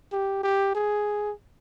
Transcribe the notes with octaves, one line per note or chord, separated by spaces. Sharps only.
G4
G4
G#4